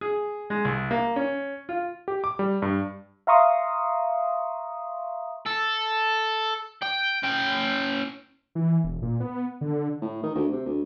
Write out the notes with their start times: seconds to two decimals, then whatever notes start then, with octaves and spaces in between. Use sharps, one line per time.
0.01 G#4
0.50 G#3
0.65 C2
0.91 A#3
1.16 C#4
1.69 F4
2.08 G4
2.24 D6
2.39 G3
2.62 G2
3.27 E5 F5 A#5 C6 C#6 D#6
5.46 A4
6.83 G5
7.24 C#4 G5
8.55 E3
8.84 E1
9.02 A#2
9.20 B3
9.61 D3
10.01 A2
10.23 D#3
10.35 D2
10.52 C3
10.66 D2